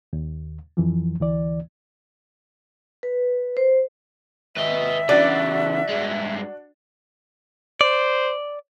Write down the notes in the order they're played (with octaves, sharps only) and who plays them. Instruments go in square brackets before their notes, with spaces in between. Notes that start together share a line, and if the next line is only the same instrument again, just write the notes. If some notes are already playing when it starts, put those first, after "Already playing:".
[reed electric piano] D#2
F2 E3 F3
D2 E3 D5
[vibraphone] B4
C5
[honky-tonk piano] G#1 [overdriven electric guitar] B4 D#5 [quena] E5
[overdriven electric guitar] C#3 E3 [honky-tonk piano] D4 F#4 [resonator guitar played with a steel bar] D5
[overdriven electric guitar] G2 G#3
[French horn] C5 [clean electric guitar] D5